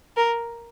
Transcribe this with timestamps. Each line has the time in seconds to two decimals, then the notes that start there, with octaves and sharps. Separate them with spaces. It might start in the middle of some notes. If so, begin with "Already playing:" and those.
0.17 A#4